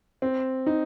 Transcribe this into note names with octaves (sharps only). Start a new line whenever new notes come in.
C4
D#4